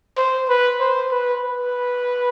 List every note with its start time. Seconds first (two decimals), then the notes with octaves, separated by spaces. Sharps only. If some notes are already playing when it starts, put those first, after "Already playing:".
0.17 C5
0.48 B4
0.80 C5
1.11 B4
1.43 B4